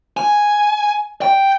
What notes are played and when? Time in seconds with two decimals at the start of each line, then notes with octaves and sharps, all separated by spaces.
0.17 G#5
1.22 G5